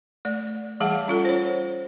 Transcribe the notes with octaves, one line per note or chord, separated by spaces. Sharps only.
A3 D5
E3 G3 G#4 F5 F#5 A5
C#4 F4 A4
C5 C#5